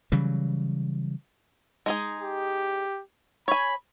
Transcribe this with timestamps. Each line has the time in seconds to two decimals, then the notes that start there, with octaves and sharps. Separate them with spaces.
0.12 C#3 E3 F#3 G3
1.86 G#3 D#4 G#4
2.20 G4
3.48 C#5 G#5 B5